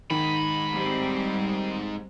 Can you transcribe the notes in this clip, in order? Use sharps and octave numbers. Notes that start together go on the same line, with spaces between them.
G#2 D#3 D#4 B5
G3 C4